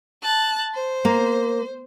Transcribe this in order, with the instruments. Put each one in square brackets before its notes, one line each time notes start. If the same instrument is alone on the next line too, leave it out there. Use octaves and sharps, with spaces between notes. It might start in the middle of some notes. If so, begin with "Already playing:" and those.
[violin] A5 F#6
C5
[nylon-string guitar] A#3